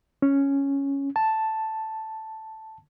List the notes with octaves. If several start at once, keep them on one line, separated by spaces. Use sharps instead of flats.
C#4
A5